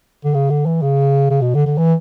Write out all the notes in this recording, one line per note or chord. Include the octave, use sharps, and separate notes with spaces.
D3
C#3
D3
E3
C#3
C#3
B2
D3
D3
E3